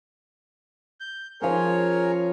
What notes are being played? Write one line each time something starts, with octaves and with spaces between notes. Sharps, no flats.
G6
F3 C#4 G#4 A#4 C#5